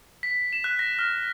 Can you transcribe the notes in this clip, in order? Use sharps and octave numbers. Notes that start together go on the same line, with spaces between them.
B6
E7
F#6
A#6
F6